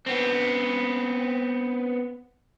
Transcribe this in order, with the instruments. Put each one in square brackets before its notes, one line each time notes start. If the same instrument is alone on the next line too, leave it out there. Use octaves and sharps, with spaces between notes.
[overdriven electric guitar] B3 C4